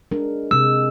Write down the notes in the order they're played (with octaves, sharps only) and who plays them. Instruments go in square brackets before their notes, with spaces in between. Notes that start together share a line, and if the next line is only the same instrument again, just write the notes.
[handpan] G#3 D4 A#4
[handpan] C3 G#3 [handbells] E6